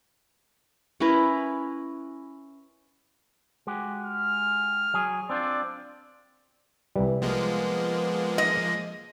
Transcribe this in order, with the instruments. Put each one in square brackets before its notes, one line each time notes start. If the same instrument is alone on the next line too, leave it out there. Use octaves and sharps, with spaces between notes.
[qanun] C#4 E4 A#4 B4
[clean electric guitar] G#3 F#4 G4
[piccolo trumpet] F6
[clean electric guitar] F#3 G#4
[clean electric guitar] C4 D4 F4 [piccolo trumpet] D5
[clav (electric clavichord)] C2 G3 [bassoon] E3
[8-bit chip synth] F3 G#3 A#3 [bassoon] B3
[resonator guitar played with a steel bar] D#5